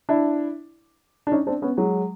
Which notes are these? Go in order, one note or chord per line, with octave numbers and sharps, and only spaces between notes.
D4 E4
D4
C#4 D#4
C4 D4
B3 C#4
F#3 G#3